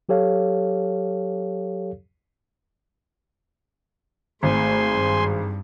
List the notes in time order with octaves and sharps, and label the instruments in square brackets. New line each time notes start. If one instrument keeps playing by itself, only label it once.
[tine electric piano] F#3 G4 A4 C#5 F5
[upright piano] G#1 [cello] A3 [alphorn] G#4 [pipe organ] C5 G#5 C6
[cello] G2